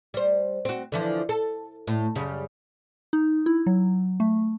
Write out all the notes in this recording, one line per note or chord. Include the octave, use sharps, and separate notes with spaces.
G3 C5
C4 F#4
D3 E3 F3
A4
A2
F#2 C#3 G3
D#4
E4
F#3
A3